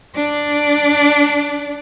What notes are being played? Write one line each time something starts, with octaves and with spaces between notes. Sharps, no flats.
D4 D5